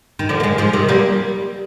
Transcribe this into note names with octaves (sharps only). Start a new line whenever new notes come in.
D#3
D3 F3
A#3
F3 G#3
F3 G#3
C3 D#3
G3 A#3